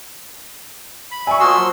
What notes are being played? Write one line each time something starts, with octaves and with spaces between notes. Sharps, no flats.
B5
D5 E5 G#5 C#6
F3 A#3 F#4 D#5 C6 E6
F#3